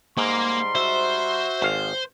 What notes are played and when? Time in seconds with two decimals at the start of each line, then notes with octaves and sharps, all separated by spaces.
0.18 G#2 G3 A#3 A#5 C6
0.75 F#4 C5 E5
1.62 G#1 C5 F5